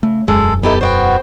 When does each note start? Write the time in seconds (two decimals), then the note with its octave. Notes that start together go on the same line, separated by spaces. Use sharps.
0.03 C#3 A3
0.28 E1 F#2 G#3 A4
0.63 B3 D#4 E4 G4 A4
0.81 B3 F#4 C5 D5 G5